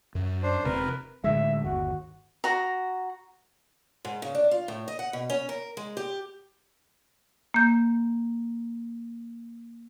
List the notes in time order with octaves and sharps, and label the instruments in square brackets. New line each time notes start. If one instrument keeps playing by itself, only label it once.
[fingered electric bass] F#2
[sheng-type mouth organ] D4 C5
[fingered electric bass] E1 C3 C4 [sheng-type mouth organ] A#4 B4
[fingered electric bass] A2 D3 G#3 [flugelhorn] E5
[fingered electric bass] G1 D#2 [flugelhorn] F#4
[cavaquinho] F#4 A#5
[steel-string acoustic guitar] G#2
C#3
D4
F4
A2
D#5
F#5
B2
C#4
A#4
G#3
G4
[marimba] A#3 G6